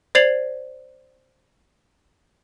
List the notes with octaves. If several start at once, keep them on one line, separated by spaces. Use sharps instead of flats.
C5 D5 G#6 C7 F7 F#7